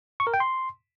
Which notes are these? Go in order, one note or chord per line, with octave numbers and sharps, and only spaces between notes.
C#6
A#4
G5
C6